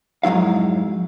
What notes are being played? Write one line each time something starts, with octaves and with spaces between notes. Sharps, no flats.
F2 G#2 F#3 E4 F5